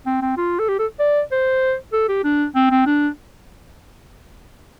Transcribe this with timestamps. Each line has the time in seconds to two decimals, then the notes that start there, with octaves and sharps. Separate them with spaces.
0.06 C4
0.22 C4
0.37 F4
0.59 A4
0.68 G4
0.79 A4
0.99 D5
1.31 C5
1.93 A4
2.09 G4
2.24 D4
2.55 C4
2.71 C4
2.86 D4